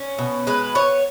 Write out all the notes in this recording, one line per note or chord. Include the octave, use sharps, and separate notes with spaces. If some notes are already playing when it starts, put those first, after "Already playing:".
Already playing: C#4
B2
G#3 B4
B3 C#5